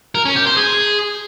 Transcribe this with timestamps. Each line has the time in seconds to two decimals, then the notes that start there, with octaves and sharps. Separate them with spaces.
0.15 A#4
0.25 C#4
0.36 G4
0.46 C5
0.57 G#4